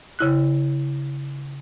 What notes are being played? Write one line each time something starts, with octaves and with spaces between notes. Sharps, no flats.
C#3 E4 F#6